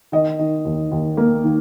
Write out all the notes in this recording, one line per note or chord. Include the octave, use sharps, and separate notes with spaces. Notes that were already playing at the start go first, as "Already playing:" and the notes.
D#3 D#5
D#3
D#2
D#2
A#3
D#3